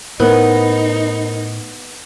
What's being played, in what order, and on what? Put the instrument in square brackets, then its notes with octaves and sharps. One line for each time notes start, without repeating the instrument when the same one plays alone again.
[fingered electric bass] A2 [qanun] B3 [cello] D#4 [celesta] A#4 C5